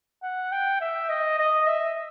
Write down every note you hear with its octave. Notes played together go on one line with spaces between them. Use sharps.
F#5
G5
E5
D#5
D#5
E5